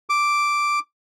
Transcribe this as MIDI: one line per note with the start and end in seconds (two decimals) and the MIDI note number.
0.10 0.79 86